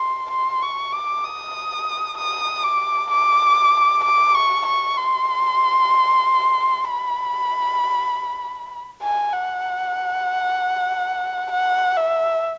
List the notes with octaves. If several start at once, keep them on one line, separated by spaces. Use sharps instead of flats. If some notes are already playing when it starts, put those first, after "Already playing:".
Already playing: C6
C6
C#6
D6
D#6
D#6
D6
D6
D6
C#6
C#6
C6
B5
G#5
F#5
F#5
E5